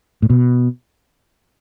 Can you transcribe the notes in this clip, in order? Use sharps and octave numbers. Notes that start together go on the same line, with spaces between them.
A2
B2